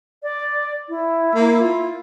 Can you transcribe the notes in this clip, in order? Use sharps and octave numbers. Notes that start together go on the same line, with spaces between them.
D5
E4
A#3
F4